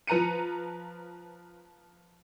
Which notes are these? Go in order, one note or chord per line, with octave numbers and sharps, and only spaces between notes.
F3 B4 A#5 C#7 D#7